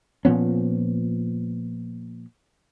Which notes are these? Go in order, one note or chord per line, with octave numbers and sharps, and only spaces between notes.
A#2 F3 B3 C#4